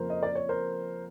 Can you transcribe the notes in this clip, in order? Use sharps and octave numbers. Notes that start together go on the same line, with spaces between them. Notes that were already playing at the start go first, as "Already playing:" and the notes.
Already playing: F2 C#3 F3 A#3 A#4 C5
D#5
D5
C#5
A#4 C5